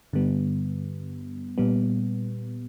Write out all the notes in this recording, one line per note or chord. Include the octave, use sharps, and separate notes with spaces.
G2 D3 G3 B3
A#2 G3 B3